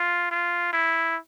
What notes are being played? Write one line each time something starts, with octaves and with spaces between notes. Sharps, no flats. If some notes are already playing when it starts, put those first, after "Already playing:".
Already playing: F4
F4
E4